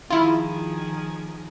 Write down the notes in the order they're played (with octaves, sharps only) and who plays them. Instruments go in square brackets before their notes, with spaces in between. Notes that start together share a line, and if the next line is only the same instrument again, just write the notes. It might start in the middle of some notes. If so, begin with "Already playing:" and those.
[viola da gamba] D#3 F3 G#4 [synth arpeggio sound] E4 F4